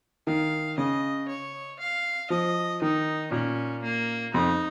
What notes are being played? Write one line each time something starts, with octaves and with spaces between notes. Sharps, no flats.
D#3 F5
C#3 D#5
C#5
F5
F3 D#5
D#3 D#4
A#2 C#4
A#3
F2 D#4